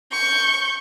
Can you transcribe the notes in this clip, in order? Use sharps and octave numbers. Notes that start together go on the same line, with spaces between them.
C#6 G6